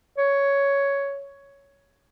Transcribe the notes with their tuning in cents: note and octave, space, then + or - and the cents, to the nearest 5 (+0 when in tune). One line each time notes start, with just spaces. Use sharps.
C#5 +10